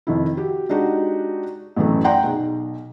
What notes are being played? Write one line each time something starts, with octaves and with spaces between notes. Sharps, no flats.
F2 D#3 E4
F#4 G4
G#3 D4 D#4 F#4 G4
A1 F#2 E3 A3
D5 F#5 G5 A#5 C6
B1 G#4